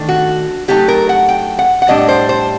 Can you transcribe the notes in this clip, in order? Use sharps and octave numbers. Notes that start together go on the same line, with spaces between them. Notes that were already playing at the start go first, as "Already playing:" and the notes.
Already playing: D#3 A3 D4
F#4
F#3 A3 D#4 G4
A#4
F#5
G5
F#5
F#5
A2 G3 D4 D#5
C5
C5